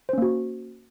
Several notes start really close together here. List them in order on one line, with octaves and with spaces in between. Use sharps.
C5 C#4 A#3 F#4